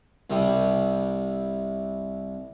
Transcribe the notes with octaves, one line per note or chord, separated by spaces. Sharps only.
C2 C3 G3